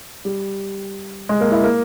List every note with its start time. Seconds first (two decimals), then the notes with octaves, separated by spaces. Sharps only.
0.25 G3
1.29 G#3
1.41 A#3
1.52 E4
1.64 A#3